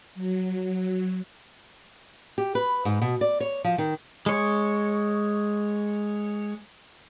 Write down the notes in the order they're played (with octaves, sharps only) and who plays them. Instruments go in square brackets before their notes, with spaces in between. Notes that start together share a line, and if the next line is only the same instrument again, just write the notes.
[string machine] F#3
[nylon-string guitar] G4
B4
G#2
B2
D5
C#5
F3
D#3
[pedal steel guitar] G#3 C#5